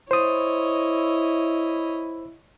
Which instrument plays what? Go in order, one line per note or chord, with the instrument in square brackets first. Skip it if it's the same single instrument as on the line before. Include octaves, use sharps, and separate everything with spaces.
[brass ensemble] E4 [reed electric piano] C5 D#6 [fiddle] C#5 D#5